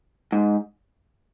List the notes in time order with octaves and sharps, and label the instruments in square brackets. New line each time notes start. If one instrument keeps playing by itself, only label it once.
[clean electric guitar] G#2